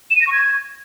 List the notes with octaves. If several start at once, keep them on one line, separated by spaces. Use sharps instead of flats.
E7
D#7
A#6
C#6
G#6